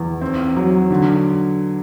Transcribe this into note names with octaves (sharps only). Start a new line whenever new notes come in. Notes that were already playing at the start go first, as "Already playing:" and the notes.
Already playing: E2
C4
F#3
D3